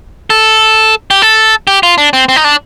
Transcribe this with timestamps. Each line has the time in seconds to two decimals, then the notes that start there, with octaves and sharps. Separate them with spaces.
0.30 A4
1.11 G4
1.22 A4
1.67 G4
1.83 F4
1.98 D4
2.13 C4
2.29 C4
2.36 D#4
2.44 D4